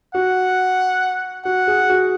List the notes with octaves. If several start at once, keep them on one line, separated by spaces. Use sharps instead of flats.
F#4 F#5
F#4 F#5
G#4
F#4